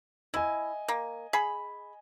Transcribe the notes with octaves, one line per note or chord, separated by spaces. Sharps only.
E4 D#5 G#5
A#3
G#4 B5